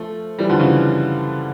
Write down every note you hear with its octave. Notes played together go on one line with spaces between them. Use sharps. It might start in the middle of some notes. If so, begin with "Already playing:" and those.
Already playing: F3 A3
E3 G3
D3 F3
C#3 E3